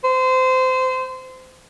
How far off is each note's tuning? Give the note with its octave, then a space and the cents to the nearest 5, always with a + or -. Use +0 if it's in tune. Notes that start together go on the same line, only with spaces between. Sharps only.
C5 -25